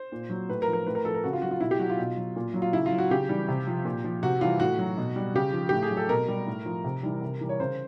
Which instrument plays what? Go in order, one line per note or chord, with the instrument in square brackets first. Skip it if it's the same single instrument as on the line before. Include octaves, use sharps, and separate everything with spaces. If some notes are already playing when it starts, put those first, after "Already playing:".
Already playing: [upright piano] C5
A#2
F#3
A2 B4
A#4
F3
A#4
A2 B4
A#4
F3 A4
A#4
C#3 F#4
F4
F#3 F#4
F4
B2 E4
G4
F#3 F#4
F4
B2
F#3
A#2
F#3
F4
C#3 E4
F4
F#3
F#4
C#3 G4
E3 G3
C3
F3
A#2
F3
C3 F#4
E3 G3 F4
A2 F#4
F#3
B2
G3
C#3 G4
F3
A2 G4
G#4
F#3
A4
B2 A#4
G3
A2
F3
C3
E3 G3
C3
E3 G3
C#5
C#3 C5